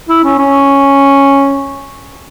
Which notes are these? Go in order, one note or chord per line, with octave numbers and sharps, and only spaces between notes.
E4
C#4
C#4